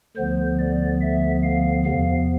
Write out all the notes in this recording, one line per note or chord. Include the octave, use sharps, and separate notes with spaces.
D2 D3 F3 B3 C5
D5
E5
F5
E2 C3 F3 B3 F5